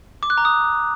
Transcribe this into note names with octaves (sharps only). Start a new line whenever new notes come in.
D6
F#6
A#5
D#6